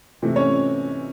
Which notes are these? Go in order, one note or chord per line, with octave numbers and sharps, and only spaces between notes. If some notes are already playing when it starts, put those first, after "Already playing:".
C3 E3 A3
C#4 C#5